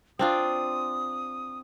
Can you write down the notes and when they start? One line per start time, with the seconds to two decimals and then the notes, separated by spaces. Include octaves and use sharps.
0.19 C4 D4 F4 D#6